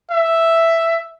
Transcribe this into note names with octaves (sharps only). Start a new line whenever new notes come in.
E5